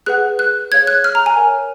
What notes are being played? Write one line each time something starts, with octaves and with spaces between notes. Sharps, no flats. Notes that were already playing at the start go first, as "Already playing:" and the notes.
G#4 B4 F#5 F#6
F#6
G#4 C#5 F5 G#6
F#6
F6
A#5
G#5
A#4 C#5 F5